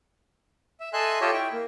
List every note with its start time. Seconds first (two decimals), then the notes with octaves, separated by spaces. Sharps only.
0.80 E5
0.93 A4 D#5 E5 G#5 C6 F#6
1.21 F4 G4 A4 C#5 D#5 E5
1.33 E4 G5
1.53 A#3